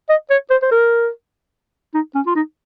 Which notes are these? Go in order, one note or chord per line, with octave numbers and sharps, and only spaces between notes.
D#5
C#5
C5
C5
A#4
D#4
C#4
F4
D#4